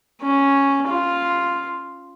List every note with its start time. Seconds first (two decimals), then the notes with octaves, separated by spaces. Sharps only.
0.22 C#4
0.88 F4